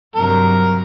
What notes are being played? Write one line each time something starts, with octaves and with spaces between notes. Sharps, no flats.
G2 C3 F#3 A#4